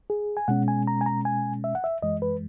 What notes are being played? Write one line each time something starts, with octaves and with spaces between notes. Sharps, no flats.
G#4
G#5
B2 G#3 C#4 F#5
G#5
A#5
G#5
A#5
G#5
E5
F#5
E5
F#2 E3 G#3 D#5
B4